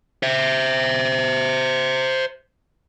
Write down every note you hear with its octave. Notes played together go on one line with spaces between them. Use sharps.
C5 E5